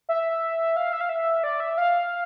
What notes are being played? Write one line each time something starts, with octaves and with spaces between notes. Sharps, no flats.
E5
F5
E5
F5
E5
D5
E5
F5